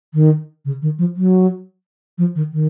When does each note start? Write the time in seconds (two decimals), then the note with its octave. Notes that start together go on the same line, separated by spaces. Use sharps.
0.14 D#3
0.65 C#3
0.82 D#3
0.99 F3
1.16 F#3
2.18 F3
2.35 D#3
2.52 D#3